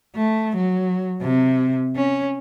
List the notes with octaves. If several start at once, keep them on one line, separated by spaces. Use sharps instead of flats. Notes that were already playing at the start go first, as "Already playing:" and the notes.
A3
F#3
C3
C#4